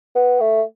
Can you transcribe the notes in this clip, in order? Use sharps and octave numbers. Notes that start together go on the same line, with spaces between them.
B3
A3